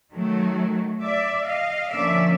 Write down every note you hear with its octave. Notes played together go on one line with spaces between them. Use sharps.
D#3 F#3 A3
D5 E5
D#5 F5
D3 F3 A#3 C#4 D5 E5